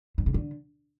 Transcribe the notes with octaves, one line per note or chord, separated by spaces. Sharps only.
G2
C#3
D3